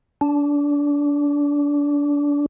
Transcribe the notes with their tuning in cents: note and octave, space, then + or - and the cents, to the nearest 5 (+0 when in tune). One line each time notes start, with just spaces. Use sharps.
D4 -25